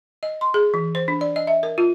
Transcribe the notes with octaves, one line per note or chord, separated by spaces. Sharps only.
D#5
C6
G#4
E3
C5
D4
D5
D#5
E5
A#4
F4